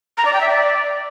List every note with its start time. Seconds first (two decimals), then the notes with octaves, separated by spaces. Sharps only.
0.18 A#5
0.25 D5
0.33 G5
0.41 E5
0.49 D5